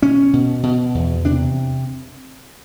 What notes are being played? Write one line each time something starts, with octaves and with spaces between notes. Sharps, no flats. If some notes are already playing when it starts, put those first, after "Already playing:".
B2 C#4
B2
B2
E2
C3 D4